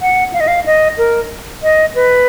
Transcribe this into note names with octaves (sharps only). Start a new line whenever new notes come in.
F#5
F5
D#5
F5
D#5
A#4
D#5
B4